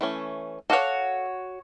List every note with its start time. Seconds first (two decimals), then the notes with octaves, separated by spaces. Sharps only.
0.01 E3 A3 C#4
0.70 F#4 A4 C#5 F5 F#5